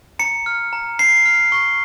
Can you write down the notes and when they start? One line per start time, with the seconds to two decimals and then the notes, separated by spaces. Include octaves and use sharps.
0.19 A#5 C#7
0.46 F6
0.73 A#5
0.99 A#5 C7
1.25 F6
1.52 C#6